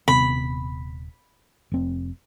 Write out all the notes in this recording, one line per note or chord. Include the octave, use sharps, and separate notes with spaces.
D#1 C3 B3 B5
F1 C4